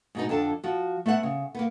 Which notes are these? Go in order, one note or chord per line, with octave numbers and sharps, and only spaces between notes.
G#2 B2 D#4
F2 D3 D4 A4 A5
F3 F#4
A3 B3 E5 F#5
C#3
A#3 B3